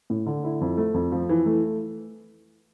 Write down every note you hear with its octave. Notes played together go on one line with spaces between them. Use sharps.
A2
D3
E4
F2
A3
F2
F3
E3
A3